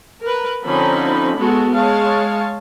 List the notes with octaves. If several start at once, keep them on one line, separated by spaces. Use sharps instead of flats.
A#4 B4
D3 F3 C4 C#4 D#4 B5
G#3 B3 F#4 A4
G#3 C#5 F5 A5